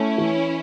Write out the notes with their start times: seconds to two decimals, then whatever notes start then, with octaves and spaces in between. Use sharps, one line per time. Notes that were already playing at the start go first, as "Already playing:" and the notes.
Already playing: A3 C#4 E4
0.18 E3